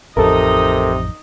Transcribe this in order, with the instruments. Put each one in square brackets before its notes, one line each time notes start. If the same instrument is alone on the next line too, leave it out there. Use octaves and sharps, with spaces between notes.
[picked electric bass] A1 F2 [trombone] C3 [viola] D#4 D#5 [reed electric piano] A4 A#4